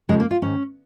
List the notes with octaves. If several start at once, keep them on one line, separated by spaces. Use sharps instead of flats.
F2 C#3 F3 G#3
A#3
F4
G#2 D#3 C#4